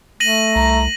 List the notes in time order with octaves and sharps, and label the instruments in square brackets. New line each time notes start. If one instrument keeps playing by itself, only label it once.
[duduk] A3 [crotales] A#6 D#7 F#7
[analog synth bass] C2 [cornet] A#5